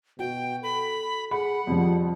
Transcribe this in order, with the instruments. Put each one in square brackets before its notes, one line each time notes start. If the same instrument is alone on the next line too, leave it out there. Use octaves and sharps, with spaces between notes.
[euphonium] B2 [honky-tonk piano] F#4 [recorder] G5
[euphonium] A4 [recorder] B5
[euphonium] G#4 [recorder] F#5 [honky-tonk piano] B5
[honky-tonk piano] F2 F3 [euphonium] G3